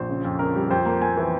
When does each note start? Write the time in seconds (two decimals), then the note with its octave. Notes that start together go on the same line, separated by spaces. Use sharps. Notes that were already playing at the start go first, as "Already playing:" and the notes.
Already playing: A#1 C5
0.09 C#3
0.25 F2
0.39 C#3 A#4
0.56 G3
0.70 F2 C5
0.86 A#3
1.01 A#3 G#5
1.17 E3